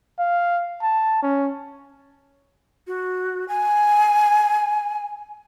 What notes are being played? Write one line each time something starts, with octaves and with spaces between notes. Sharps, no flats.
F5
A5
C#4
F#4
G#5